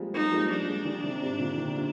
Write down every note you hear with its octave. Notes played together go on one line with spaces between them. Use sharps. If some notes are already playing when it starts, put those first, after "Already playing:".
Already playing: F3 G3 G#3 A#3
G3 A#3 D#4
F3 G#3
F3 G#3 D4
F3 G#3
D#3 G3
C3 D#3
G#2 C3
A#2 D3
C3 D#3
A#2 D3